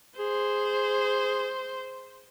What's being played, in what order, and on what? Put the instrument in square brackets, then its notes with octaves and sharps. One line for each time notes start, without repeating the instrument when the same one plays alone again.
[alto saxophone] G#4 [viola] C5